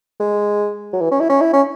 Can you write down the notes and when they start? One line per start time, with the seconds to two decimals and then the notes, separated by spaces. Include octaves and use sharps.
0.20 G#3
0.93 F#3
1.01 E3
1.11 C#4
1.20 E4
1.29 C#4
1.41 E4
1.53 C#4